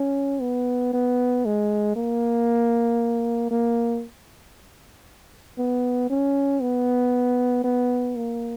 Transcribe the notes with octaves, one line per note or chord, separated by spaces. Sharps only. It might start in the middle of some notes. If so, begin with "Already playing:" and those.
Already playing: C#4
B3
B3
G#3
A#3
A#3
B3
C#4
B3
B3
A#3